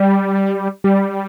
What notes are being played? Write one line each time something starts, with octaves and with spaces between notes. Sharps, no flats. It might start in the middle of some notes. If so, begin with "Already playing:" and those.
Already playing: G3
G3